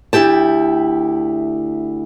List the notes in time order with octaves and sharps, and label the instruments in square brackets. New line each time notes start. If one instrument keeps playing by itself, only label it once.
[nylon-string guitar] D2 E4 G4 G5 A5